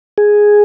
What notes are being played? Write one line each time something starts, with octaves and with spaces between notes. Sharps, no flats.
G#4